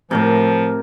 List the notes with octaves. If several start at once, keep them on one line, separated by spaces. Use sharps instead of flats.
A2 C3 F3 A#4 D6